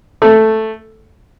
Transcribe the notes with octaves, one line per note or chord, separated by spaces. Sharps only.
A3